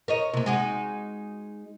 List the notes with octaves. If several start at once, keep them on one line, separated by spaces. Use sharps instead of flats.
A#4 C#5 D#5
C3 A#3
G#3 D#4 F#4